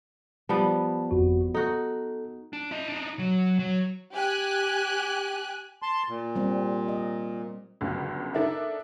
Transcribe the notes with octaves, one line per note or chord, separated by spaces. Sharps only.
F3 G3 B3 A5
G1 F2 F#4
D#4 F#4 A4
D4
E4 D#5
D4 D#4
F#3
F#3
G4 G#5 F#6
A5 C6
A#2
G3 C4
D#5
G1 C#2 F#2
D4 D#4 A4 A#4 E5